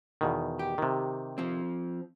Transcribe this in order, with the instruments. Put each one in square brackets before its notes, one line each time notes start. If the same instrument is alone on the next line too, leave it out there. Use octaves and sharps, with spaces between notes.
[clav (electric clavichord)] E2 B2 D#3
[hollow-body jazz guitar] G4
[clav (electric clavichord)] C3 D#3
[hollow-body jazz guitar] F3 C4